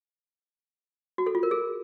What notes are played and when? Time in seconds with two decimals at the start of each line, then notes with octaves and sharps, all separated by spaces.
1.18 F#4
1.26 A4
1.35 F4
1.43 A#4
1.51 G#4